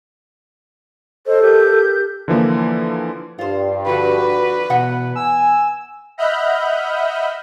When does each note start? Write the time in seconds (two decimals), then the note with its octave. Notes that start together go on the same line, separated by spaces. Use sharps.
1.26 A4 C5 D#5
1.41 G4 A#4 G6
2.28 D3 E3 F3 A#3
3.39 G2 F4 C5
3.86 D3 F3 F#4 B4
4.70 E2 B2 B3 F#5
5.16 G#5 E6
6.18 D#5 E5 F#5 B5 F6 G6